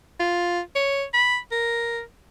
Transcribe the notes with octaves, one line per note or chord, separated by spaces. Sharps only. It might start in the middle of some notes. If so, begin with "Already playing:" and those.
F4
C#5
B5
A#4